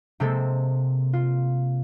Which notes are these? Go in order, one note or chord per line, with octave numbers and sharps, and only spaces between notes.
C3 G#3 A#3 C4 A4
F4